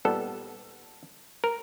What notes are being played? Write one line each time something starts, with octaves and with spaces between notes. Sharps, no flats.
A#2 G3 B3 D#4 A4
A#4